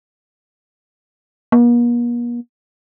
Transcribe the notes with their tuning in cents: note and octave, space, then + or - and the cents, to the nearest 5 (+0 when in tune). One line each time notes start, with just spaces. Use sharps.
A#3 +45